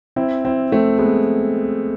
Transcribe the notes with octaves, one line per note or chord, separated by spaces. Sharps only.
C4 E4
C4 E4
A3 C4
G#3 B3